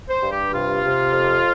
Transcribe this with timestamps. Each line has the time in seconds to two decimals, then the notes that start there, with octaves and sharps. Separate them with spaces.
0.09 C5
0.23 G2
0.31 G4
0.53 C3 F4
0.83 C3
1.13 F2